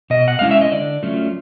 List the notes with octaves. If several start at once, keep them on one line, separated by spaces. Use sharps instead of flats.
B2 D#5
F#5
G#3 C#4 E4 F5
E5
D#5
D3 D5
F#3 A3 C#4 F4